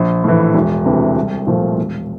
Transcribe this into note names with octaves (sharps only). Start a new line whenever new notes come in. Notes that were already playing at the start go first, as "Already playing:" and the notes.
Already playing: A#1
A2 E3
E1
D2 C3 E3
C2
A#2 F3 A3
E1